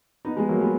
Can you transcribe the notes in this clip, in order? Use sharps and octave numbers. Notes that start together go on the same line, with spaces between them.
B3 D#4
G#3 B3
F#3 A#3
G#3 B3